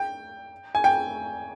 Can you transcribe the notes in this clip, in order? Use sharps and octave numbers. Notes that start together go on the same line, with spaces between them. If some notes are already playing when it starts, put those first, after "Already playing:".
Already playing: G5
G#5
G5